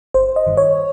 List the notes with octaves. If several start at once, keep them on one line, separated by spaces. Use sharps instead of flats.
G1 C5
D#5
G2 D#3
C#5